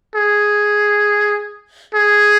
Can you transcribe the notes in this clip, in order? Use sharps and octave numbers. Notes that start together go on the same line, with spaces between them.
G#4
G#4